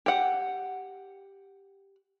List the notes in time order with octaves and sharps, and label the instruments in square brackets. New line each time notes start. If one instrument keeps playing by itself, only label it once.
[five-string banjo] G4 F#5